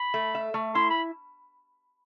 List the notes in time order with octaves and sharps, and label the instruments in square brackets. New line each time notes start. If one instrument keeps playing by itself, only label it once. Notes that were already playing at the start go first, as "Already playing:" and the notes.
Already playing: [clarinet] B5
[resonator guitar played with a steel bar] A3
E5
A3
[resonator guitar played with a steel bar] E4 [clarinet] C6
[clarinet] B5